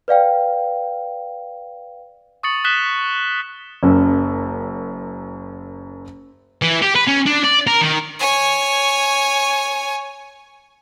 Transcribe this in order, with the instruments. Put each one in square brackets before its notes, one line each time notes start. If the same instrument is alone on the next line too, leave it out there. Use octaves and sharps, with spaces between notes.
[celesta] B4 D5 F5 G5
[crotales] C#6 D#6 A6 C#7 F#7
D#6 F#6 B6 E7 G7
[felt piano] F#1 F#2
[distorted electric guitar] E3
G4
B4
C#4
D4
D5
A#4
D#3
[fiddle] C#5 G#5